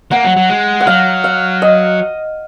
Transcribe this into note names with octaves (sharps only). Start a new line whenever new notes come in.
A#3 F#5
F#3
F#3
G#3
F#5
F#3 F5
F5
D#5